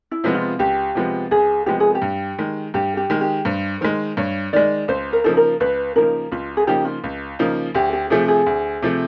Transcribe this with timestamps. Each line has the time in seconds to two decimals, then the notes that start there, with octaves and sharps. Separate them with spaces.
0.11 E4
0.24 C3 F3 G#3 B3
0.35 F4
0.59 C#2 G4
0.95 C3 F3 G#3 B3
1.31 C#2 G#4
1.66 C3 F3 G#3 B3 G4
1.80 G#4
1.95 G4
2.02 G2
2.38 D#3 G#3
2.74 G2 G4
2.97 G4
3.10 D#3 G#3
3.21 G4
3.45 G2 C5
3.81 D#3 G#3 C5
4.17 G2 C#5
4.53 D#3 G#3 D5
4.88 C#2 C5
5.13 A#4
5.24 C#3 F3 A#3 D#4 A4
5.37 A#4
5.60 C#2 B4
5.96 C#3 F3 A#3 D#4 A#4
6.32 C#2 F4
6.57 G#4
6.67 C#3 F3 A#3 D#4 G4
6.85 F4
7.04 C#2
7.39 C#3 F3 A#3 D#4
7.75 D2 G4
7.93 G4
8.10 C3 F3 A3 G#4
8.28 G#4
8.46 D2
8.82 C3 F3 A3